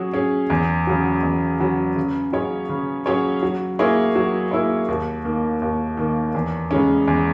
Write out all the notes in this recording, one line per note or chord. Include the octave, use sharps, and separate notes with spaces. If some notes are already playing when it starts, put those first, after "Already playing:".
Already playing: F#3 C#4 G#4
C#4 G#4
E2
C#3 F#3
E2
C#3 F#3
C#3
F#3 C#4 G#4 C#5
C#3
F#3 C#4 G#4 C#5
F#3
A#3 E4 G#4 C#5
F#3
A#3 E4 G#4 C#5
D#2
D#3 A#3
D#2
D#3 A#3
E2
C#3 G#3 C#4
E2